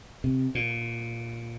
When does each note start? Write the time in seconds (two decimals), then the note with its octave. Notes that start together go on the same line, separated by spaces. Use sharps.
0.24 C3
0.55 A#2